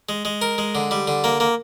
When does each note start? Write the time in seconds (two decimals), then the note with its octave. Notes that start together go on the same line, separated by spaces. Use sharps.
0.09 G#3
0.25 G#3
0.42 A#4
0.58 G#3
0.75 D3
0.91 G3
1.08 D3
1.24 A#3
1.40 A#3